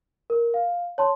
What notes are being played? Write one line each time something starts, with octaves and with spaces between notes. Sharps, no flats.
A#4
F5
C#5 A5 C6